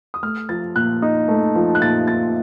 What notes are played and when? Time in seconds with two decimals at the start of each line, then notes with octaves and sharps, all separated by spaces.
0.14 D#6
0.23 A3 F6
0.49 F3 A6
0.76 A#2 F#6
1.02 D#4
1.28 A3
1.55 F3
1.75 F#6
1.82 A#2 A6
2.08 D#4 A6